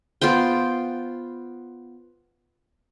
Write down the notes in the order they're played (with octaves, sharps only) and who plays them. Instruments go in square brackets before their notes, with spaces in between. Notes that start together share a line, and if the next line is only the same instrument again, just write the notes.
[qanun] B3 F4 C5 G5